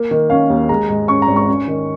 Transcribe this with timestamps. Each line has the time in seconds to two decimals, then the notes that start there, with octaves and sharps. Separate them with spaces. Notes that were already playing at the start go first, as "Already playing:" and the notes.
Already playing: A#3
0.11 D#3
0.30 C#4 F5
0.50 D#2
0.69 G#3 A#5
0.89 G#2
1.08 C#4 C#6
1.22 A#5
1.28 G#1
1.36 C#6
1.48 C#4
1.68 D#3